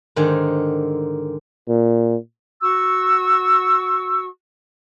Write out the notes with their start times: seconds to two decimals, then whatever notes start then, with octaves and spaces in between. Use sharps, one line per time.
0.16 G#2 D3 D#3 C5 G#5
1.68 A#2
2.60 F#4 C#6 E6